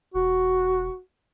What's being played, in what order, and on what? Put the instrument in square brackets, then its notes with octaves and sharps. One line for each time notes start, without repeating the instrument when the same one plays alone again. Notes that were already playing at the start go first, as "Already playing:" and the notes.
[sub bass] E1 [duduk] F#4